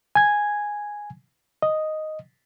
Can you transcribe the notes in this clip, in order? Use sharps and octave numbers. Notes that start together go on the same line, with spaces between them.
G#5 G#6
D#5